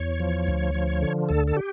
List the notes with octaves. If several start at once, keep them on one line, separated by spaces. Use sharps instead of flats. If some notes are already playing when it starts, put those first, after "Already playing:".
Already playing: E2 C#5
F3
D2
F3
D3
D2 A4
A4
G4